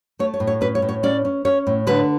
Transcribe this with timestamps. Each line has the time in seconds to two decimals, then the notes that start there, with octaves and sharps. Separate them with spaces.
0.19 A3 C#5
0.34 C#5
0.40 A2
0.47 C#5
0.61 C#4 B4
0.75 C#5
0.82 A2
0.89 C#5
1.03 C#4 D5
1.25 C#4
1.45 C#4 C#5
1.67 A2
1.87 D3 B4